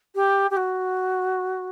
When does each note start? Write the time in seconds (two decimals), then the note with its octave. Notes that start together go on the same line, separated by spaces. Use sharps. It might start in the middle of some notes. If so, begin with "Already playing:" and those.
0.15 G4
0.51 G4
0.57 F#4